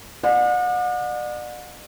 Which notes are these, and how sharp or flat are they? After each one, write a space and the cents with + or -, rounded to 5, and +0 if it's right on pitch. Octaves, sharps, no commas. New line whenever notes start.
D5 +40 F#5 -40